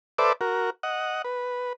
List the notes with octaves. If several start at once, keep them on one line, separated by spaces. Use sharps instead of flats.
A4 B4 C5 D5 E5 D6
F#4 A#4
D#5 F#5
B4